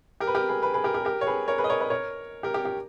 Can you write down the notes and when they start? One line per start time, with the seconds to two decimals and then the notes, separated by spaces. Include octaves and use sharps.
0.20 G4 A#4
0.27 B4
0.35 G4 A#4
0.49 G#4 B4
0.63 G#4 B4
0.73 G#4 B4
0.84 G4 A#4
0.94 G4 A#4
1.05 G4 A#4
1.21 C#5
1.27 G#4 B4
1.48 A#4 C#5
1.58 G#4 B4
1.64 D#5
1.70 A#4 C#5
1.80 B4 D#5
1.90 A#4 C#5
2.43 G4 A#4
2.54 G4
2.65 G4